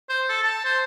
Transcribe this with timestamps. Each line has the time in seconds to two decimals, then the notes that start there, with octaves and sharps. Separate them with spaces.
0.09 C5
0.29 A4
0.43 A5
0.65 C5